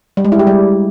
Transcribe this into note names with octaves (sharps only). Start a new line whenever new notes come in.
G3
G#3
E4
G4
G3